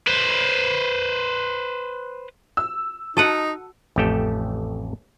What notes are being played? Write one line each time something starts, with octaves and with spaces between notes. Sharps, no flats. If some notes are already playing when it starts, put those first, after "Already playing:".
B4 C5
E6
D#4 F#4 A4 F#5 A5
A1 F2 A3 G4 A4 G5